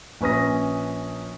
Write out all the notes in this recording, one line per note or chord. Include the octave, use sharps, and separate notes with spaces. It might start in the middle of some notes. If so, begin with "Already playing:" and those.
A#1 C#4 B4 D#6 A#6